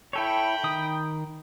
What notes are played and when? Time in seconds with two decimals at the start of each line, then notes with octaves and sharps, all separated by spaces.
0.13 E4 A4 C#5 G5 B5
0.64 D#3 D#6